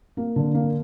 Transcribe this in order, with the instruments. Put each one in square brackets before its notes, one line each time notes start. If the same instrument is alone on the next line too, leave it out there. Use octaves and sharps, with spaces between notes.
[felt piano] A#3
D3
A#3